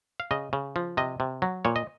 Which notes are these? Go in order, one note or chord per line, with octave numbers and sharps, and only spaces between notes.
F5
C#3 D#5
C#3
F3
C3 D#5
C3
F#3
A#2 C#5
D#5